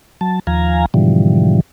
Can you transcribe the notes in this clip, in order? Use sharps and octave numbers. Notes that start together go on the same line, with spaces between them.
F#3 A5
D#2 F3 F5 G#5 A#5
G#2 B2 D3 E3 F3 G3